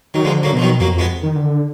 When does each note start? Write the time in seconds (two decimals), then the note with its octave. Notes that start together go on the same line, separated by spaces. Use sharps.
0.14 D#3 F#3
0.25 D3 F3 G#3
0.43 F#3 A#3
0.46 D3
0.53 B2 F3
0.62 D#3 F#3
0.80 F2 F#3 A#3
0.94 F2 G#3 B3
1.23 D#3
1.36 D3